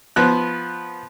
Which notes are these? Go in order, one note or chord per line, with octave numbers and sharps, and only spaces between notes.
F3 B3 F#6